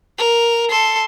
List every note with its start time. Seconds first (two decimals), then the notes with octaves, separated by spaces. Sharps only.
0.18 A#4
0.70 A4 C6